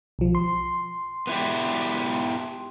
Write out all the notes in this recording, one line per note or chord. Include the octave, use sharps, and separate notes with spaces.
B1 F3
C6
B3 E4 G4